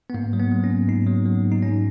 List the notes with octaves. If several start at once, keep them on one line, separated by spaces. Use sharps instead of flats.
B3
G#2 A#3
F#3
B3
F#3
C#4
G#2
G#2 D#4
F#3
F#3
G#2
D#4
G#2 C#4